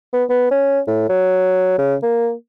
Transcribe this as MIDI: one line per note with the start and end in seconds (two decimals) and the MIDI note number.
0.13 0.24 59
0.30 0.47 59
0.51 0.80 61
0.87 1.05 45
1.09 1.75 54
1.79 1.95 49
2.03 2.32 58